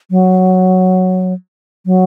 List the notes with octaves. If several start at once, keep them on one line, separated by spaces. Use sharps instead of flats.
F#3
F#3